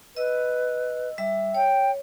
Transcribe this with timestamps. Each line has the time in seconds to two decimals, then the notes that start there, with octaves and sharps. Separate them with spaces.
0.17 B4 D#5 E6
1.18 G3 E5 E6
1.55 C#5 G5